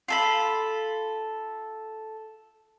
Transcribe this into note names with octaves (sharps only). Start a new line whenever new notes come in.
F4 A4 B5